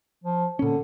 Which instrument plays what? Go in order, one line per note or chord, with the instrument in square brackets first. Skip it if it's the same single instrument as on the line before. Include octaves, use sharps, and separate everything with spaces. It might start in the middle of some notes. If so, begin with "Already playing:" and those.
[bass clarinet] F3
[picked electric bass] A#2 C#4 [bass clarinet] D3